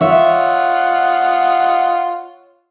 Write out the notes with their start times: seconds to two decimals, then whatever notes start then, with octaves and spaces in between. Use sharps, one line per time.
0.01 F4 C#5 D#5 E5 F#5